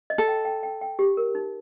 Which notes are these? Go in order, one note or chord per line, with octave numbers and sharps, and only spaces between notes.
D#5
A4
G5
G5
G5
G5
G4
A#4
D#4